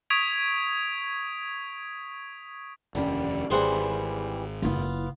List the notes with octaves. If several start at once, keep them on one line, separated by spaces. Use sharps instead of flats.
C#6 D#6 G#6 B6 D7 F7
F1 D#2 D3 G3 C#4
G#1 E3 G3 G4 G#4 C5 F#5
F#1 B3 E4 F4